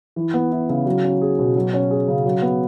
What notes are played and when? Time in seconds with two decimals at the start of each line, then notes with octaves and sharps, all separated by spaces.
0.16 E3
0.34 B3
0.52 E4
0.69 C#3
0.86 F#3
1.04 C#4
1.22 G#4
1.39 B2
1.56 F#3
1.74 C#4
1.91 G#4
2.08 C#3
2.26 F#3
2.42 B3